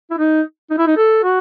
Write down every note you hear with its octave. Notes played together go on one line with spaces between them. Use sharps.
E4
D#4
D#4
E4
D#4
A4
F#4